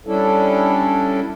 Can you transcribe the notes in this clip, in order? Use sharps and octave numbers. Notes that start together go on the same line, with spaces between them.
G3 C#4 D4 E4 A4